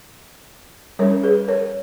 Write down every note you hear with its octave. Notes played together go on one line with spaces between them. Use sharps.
G3 C#4 A#4 C#5
G#4 B4
A#4 C#5